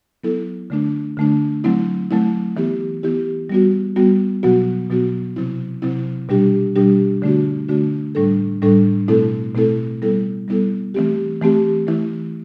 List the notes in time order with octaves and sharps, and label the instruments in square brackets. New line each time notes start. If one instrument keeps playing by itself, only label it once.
[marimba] F#3 B3 E4 A4
D3 A3 D4
D3 A3 D4
F#3 A3 C4 E4
F#3 A3 C4 E4
E3 B3 E4 G4
E3 B3 E4 G4
G3 B3 F#4
G3 B3 F#4
B2 F#3 B3 F#4
B2 F#3 B3 F#4
C3 F#3 C4 E4
C3 F#3 C4 E4
B2 G3 D4 G4
B2 G3 D4 G4
D3 A3 D4 F#4
D3 A3 D4 F#4
A2 G3 D4 A4
A2 G3 D4 A4
B2 A3 C4 E4 A4
B2 A3 C4 E4 A4
G3 B3 E4 A4
G3 B3 E4 A4
E3 A3 C4 G4
E3 A3 C4 G4
E3 A3 E4